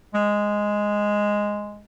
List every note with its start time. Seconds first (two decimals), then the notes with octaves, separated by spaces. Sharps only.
0.14 G#3